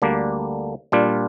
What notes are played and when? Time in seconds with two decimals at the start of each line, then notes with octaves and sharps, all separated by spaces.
0.02 D2 D3 G3 A#3 D4
0.92 A#2 G3 D4 F4